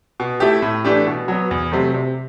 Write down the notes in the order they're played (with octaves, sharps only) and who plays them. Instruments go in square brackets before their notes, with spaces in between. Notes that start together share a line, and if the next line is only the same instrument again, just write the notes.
[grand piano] B2
A3 E4 G4
A2
E3 A3 D4 G4
B2
F#3 B3
E2
C3 F#3 A3
C3